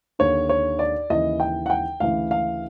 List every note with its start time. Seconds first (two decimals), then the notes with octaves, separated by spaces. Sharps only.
0.19 D#2 D3 C#5
0.49 C#5
0.79 D5
1.10 D#2 C#3 E3 D#5
1.40 G5
1.66 F#5
1.70 G5
2.00 D2 C#3 E3 F5
2.31 F5